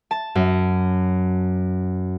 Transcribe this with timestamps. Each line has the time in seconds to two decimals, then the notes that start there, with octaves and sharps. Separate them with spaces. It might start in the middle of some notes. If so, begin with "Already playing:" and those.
0.11 A5
0.35 F#2